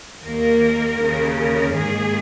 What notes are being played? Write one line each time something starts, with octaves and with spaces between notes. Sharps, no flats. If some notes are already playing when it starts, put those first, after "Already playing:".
D#2 D#3 A#3 A#4
D#2 C#3 A#3
A#4
G#2 D#3 A#3 G#4